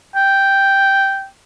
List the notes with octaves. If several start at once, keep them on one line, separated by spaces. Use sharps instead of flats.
G5